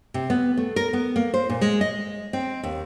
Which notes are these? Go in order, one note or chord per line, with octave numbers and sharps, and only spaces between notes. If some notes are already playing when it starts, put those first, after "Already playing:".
C3
B3
A3
A#4
B3
A#3
C5
A#2
G#3
D#5
C4
D#2